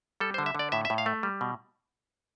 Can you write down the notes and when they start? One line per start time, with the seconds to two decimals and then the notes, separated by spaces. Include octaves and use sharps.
0.20 G3 A4
0.34 C5
0.38 D3
0.46 E5
0.55 D3 D5
0.72 A2 E5
0.85 E5
0.90 A2
0.98 F5
1.06 A3
1.23 G3
1.41 B2